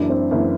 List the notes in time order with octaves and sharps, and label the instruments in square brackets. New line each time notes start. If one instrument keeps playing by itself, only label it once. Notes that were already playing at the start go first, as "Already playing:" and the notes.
Already playing: [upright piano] F#1 F#2 E3 [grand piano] D4
[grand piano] C4
[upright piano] F#1 E3